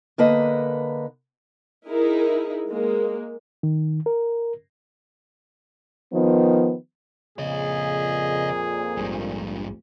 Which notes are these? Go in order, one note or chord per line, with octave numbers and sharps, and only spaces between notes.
D3 A#3 B4 D#5
D#4 E4 G#4 A#4
G#3 A#3
D#3
A#4
D#3 F3 B3
F2 A#2 C#3 G#4 C#5 D#5
A#1 G#2 G3